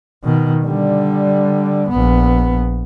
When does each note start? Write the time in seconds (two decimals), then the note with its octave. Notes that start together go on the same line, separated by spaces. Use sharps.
0.24 B2 D#3
0.64 D3 G3
1.89 A#1 B3